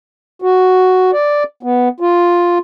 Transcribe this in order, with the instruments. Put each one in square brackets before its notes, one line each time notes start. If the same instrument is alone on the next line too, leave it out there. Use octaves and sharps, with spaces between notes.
[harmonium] F#4
D5
B3
F4